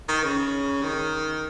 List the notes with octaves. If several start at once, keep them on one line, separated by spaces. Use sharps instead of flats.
D#3
C#3
D#3